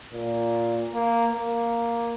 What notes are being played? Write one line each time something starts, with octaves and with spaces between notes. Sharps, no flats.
A#2
A#3
A#3